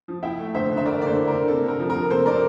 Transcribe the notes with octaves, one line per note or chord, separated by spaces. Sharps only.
F3
E4 E5 G5
A3
D3 C5 E5
D3
E5
A3 A#4 D5
D3 D5
A4 C5
E4
D3 A#4
C3 A4
C3 A#4
F3
A#4
F3
C3 A4 C5
C3 A#4 D5